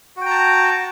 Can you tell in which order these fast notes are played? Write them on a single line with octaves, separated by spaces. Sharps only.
F#4 G5 A#5 A5